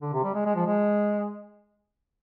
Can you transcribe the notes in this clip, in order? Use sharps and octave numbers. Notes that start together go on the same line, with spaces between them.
D3
C3
G3
G#3
G#3
F3
G#3